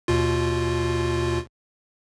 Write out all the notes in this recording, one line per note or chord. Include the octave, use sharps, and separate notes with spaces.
D#2 B2 F4